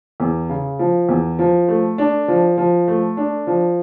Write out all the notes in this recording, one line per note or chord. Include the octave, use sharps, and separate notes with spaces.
E2
C#3
F3
E2
F3
A3
D4
F3
F3
A3
D4
F3